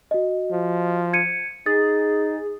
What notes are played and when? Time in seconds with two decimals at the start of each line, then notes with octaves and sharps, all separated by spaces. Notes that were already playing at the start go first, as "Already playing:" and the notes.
0.11 F#4 D#5
0.51 F3
1.13 G#6 C#7 D#7
1.66 D#4 G#4 A6